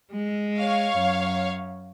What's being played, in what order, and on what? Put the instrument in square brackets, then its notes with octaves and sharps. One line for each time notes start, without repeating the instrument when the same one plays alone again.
[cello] G#3
[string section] C#5 F5
[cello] F#2